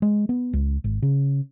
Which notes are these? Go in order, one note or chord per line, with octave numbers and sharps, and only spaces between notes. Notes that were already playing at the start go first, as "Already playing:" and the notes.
G#3
B3
C#2
G#1
C#3